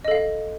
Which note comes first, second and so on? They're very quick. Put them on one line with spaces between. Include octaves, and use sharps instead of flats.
D#5 A4 F5